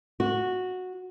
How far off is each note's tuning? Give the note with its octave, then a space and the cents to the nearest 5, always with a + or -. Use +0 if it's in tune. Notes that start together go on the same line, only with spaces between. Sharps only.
F#4 -10